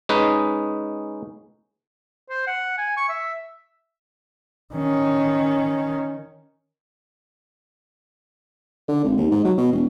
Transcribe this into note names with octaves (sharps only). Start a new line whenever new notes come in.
G#3 C#4 D#4 B4
C5
F#5
G#5
C#6
E5
D#3 C#4
D3
G#1
D#2
G#2
F#3
B2
E1